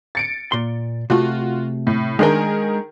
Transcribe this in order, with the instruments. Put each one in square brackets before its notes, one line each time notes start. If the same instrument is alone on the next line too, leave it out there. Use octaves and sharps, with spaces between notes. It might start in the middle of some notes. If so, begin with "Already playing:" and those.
[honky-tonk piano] A6 C#7 D7
[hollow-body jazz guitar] A#2 C6
[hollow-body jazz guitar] C3 A3 [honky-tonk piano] F4 F#4
[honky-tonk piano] A2
[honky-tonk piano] D#3 G#4 A#4 [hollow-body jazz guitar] G#3 D4 G5